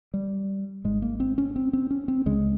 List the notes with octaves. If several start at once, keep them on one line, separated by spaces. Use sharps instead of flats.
G3
G#1 G#2 G#3
A#3
C4
C#4
C4
C4
C#4
C4
C#2 C#3 G#3